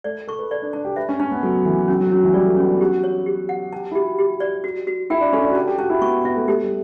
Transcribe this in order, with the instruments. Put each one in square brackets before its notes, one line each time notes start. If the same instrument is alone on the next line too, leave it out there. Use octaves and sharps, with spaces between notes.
[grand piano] A3 [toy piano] D5
[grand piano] A4 [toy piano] C#6
[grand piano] B4
[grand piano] A4 [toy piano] D5
[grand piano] D4
[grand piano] D4 [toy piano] A5
[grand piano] G4
[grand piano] B4 [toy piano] E5
[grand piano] C#4
[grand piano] C#4 [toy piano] A5
[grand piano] B3
[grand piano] F#3 [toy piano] A4
[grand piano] E3 [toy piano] A4
[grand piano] F#3 [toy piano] C#4
[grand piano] F#3
[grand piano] F#3 [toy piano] C#4
[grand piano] E3
[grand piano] G3 [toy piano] D5
[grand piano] A3
[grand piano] B3 [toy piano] C#4
[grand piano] D4
[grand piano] F#4 [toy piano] G4
[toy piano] C#5
G4
F#5
[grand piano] G4 [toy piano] A5
[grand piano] E4
[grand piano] F#4 [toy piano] G4
[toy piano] G4
D5
F#4
F#4
[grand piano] E4 [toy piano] G5
[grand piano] D4
[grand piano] C#4 [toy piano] A4
[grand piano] D4
F#4
[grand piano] G4 [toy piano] A5
[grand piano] G4
[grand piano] F#4 [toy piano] A5
[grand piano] E4
[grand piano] B3 [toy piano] C#6
[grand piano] B3 [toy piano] E5
[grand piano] A3
[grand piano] A3 [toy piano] G4
[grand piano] G3